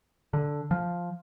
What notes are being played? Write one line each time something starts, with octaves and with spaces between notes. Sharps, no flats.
D3
F3